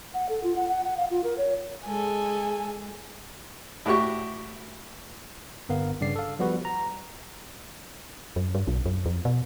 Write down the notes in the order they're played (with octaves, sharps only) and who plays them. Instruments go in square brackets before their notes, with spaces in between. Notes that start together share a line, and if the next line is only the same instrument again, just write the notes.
[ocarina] F#5
A4
F4
F#5
F#5
F#5
F5
F4
A#4
C#5
[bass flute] G#3 [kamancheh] A4 G#5
[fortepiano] A2 F#4 G4 C#6
[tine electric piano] G1 B3 A#4 F5
G2 C#3 D5 C7
A4 F5
F3 G3 B3 F#4 B4
A#5
[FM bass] F#2
G2
B1
F#2
F2
B2